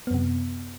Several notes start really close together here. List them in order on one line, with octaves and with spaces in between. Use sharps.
B3 F#2 C3